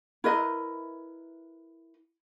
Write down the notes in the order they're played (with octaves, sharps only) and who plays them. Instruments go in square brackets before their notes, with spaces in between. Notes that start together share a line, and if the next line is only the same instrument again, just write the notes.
[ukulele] E4 A#4 B4 D#5